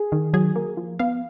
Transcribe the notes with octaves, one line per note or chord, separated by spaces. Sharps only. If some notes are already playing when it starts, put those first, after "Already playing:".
Already playing: G#4
D#3
F#3 G#4
A#3
F3
B3 F5